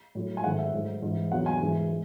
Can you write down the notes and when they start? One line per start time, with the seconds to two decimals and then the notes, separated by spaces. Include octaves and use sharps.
0.15 A2 F#3 A3
0.37 G#5
0.44 G#2 D#3 A3 F#5
0.59 E5
0.73 G#2 F#3 A3
1.02 G#2 E3 G#3
1.31 E2 C3 F#3 F#5
1.46 G#5
1.61 G#2 E3 G#3
1.89 G#3